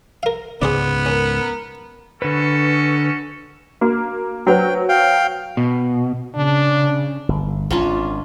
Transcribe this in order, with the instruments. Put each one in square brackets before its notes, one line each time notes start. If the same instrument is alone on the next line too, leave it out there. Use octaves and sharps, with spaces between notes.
[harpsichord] A#4 F5
[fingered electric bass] C#2 G#2 C#3 [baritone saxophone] B3 [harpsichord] G#4 C5 D5
[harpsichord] C#4 [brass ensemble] A#4
[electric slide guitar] D3 B4 [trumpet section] C#4 F#4 A4
[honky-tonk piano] A#3 [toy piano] F#4
[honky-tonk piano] F#3 [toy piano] F#4 B4 C5 [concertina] G5
[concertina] F5 G5
[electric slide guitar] B2
[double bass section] C#3 [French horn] D4
[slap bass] G1
[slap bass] G#1 [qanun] C#4 D4 F4